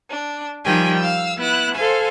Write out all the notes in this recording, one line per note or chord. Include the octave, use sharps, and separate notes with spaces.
D4
D#3 F3 G3 G5 G#5
F5 E6
B3 E4 F#6
A4 C5 F5 G#5